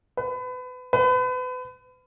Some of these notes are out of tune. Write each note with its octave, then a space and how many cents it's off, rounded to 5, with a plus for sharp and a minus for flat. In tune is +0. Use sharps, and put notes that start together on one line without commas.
B4 +30
B4 +35